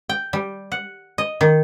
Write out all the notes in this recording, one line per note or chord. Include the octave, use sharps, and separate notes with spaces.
G5
G3
F#5
D#5
D#3